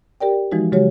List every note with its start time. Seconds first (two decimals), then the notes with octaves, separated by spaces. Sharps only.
0.21 G4 A#4 D5 G5
0.52 E3 F3 G#3 D#4 F#4
0.72 C#3 F#3 G#3 F#4 G4 C#5